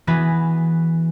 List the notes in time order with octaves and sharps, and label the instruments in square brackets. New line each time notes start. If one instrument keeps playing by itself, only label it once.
[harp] E3 B3 F#4 G#4 B4